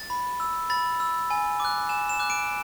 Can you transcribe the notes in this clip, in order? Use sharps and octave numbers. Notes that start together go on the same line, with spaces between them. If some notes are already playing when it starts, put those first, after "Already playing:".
Already playing: A6
B5
E6
B5 A6
E6
G#5
D6 F#6
G#5 E7
E7
D6 F#6
D7